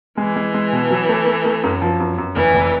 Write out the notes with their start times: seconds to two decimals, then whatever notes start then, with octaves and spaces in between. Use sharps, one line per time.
0.17 E3 G#3
0.36 G#3
0.54 G#3
0.72 B2
0.91 F#3
1.09 A3
1.27 A3
1.45 A3
1.63 F#2
1.82 F3
2.00 F#2
2.18 F#2
2.36 F1 E3
2.54 F1